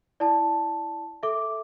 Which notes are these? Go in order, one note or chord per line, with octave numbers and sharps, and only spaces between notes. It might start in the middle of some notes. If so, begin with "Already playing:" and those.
E4 D5 A5
A4 E5 D6